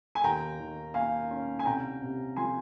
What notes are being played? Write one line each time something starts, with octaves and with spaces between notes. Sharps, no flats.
G#5
D#2 G5 A#5
D#3
A#3 F5 G#5
C#4
G#5
C2 G5 A#5
C3
F3 G#5 C6